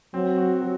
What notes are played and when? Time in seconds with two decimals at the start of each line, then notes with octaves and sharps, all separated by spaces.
0.14 F#3 C4
0.38 F#4
0.62 F#3